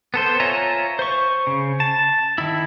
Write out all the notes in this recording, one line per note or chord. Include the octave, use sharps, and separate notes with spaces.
B3 A4 C5
F4 C#5 E5 G#5 A#5
C5 C#6
C#3
A5
D#3 E4